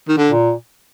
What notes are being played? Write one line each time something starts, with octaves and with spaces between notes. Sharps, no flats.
D#3
D3
A#2